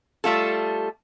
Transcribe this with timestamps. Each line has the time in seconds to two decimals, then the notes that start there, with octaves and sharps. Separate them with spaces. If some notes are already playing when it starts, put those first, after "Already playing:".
0.24 G3 A3 F4 A4